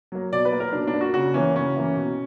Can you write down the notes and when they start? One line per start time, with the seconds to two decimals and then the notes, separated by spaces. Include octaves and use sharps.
0.12 F#3 A#3
0.32 B2 D5
0.45 B4
0.52 A#3
0.60 A#4
0.73 B2 D4
0.87 D4
0.94 A#3
1.01 F#4
1.14 C#3 F#4
1.34 E3 A#3 C#4
1.55 C#3 C#4
1.76 E3 A#3
1.96 B2